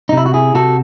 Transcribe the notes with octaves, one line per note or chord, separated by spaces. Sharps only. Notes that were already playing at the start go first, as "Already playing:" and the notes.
D#4
C3 E4
F#4
E4 G#4
C3 F#4 A4